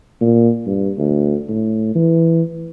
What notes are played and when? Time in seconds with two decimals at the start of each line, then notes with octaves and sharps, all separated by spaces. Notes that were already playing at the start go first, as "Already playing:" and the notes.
0.21 A#2
0.67 G2
0.98 D2
1.49 A2
1.95 E3